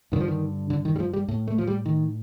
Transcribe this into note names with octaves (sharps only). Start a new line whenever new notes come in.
G2 D3 D#3
F3
D#3
D3
D#3
G3
F3
G3
A2
A3
F3
G3
D#3